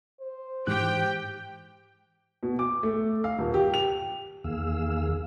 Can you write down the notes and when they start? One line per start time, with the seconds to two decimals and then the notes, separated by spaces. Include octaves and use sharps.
0.21 C5
0.67 G#2 E3 G4 G5 F#6
2.43 B2
2.59 D6
2.83 A3
3.24 F5
3.39 D#1
3.54 G4
3.74 F7
4.44 E2 D#3 A#3 G#4 F5 E6